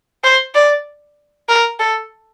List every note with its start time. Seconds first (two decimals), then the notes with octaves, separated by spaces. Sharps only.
0.24 C5
0.55 D5
1.49 A#4
1.79 A4